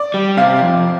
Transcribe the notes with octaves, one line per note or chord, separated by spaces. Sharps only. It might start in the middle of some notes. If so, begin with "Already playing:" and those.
Already playing: D5
G3
C3 F5
F2